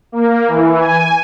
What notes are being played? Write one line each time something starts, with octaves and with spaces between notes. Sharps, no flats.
A#3
E3
G#5